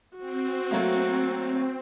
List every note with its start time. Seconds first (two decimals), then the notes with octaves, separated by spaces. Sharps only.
0.18 C4 F#4
0.71 F#3 A3 A#3